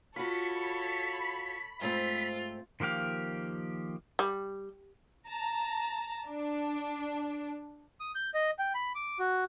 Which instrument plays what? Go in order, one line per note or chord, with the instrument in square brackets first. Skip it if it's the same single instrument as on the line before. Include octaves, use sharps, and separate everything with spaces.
[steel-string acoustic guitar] F4 F#4 [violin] A4 C#5 [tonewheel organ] B5
[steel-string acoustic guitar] G#2 A3 C4 [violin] F4
[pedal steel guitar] D#3 F3 A#3 G4 F5
[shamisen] G3
[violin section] A5 A#5
D4
[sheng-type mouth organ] D#6
G6
D#5
G5
B5
D6
F#4